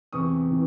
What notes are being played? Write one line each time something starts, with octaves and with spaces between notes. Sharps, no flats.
E2 C3 E3 C#6 D#6
C3 E3